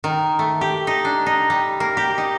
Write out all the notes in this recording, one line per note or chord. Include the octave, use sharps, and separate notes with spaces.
D#3
A3
G4
D#4
D4
D#4
G3
A#3
G4
D#4